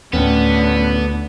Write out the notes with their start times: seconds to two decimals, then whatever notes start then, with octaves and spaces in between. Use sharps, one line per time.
0.13 D2 A2 D3 A3 B3 C#4 G5